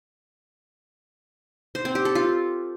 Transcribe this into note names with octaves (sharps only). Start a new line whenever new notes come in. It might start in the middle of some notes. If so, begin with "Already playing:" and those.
C5
C4
G4
A4
F4